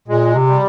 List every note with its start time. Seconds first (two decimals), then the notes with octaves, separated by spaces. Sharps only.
0.08 A#2 G#3
0.35 C3
0.48 G3